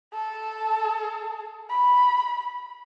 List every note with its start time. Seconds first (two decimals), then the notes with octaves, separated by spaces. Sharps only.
0.14 A4
1.70 B5